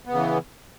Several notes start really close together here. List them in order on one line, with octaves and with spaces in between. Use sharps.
B3 C#3 E3